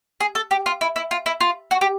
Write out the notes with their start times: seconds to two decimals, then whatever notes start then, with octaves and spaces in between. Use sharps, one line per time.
0.20 G#4
0.35 A4
0.51 G4
0.66 F4
0.81 E4
0.96 E4
1.11 F4
1.26 E4
1.40 F4
1.71 F#4
1.81 G4